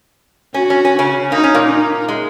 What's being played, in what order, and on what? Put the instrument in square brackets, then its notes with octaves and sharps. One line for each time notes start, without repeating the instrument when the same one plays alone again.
[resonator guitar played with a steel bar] C#4 [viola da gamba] F#4
[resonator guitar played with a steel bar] C#4
C#4
C#3 C#4
[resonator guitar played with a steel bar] A#3 [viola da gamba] D#4
[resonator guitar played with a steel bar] C#4
A#2 A#3
[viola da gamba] D#4
[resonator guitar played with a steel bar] G#3